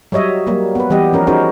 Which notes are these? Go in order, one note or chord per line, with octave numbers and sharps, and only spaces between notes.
F#3 G3 C#5 D#5 E5
F#3 G3 A#3
B3 B4
E3 G3 B3 G4 D#5
F3 C#4 A#4
C#4 D#4 F#4 G#4 A#4 C5